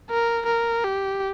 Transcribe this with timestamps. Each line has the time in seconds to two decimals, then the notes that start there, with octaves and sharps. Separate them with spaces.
0.10 A#4
0.47 A#4
0.85 G4